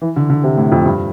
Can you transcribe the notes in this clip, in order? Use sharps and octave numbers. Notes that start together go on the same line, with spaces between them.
E3
D3
D3
C3
A2
F2
G2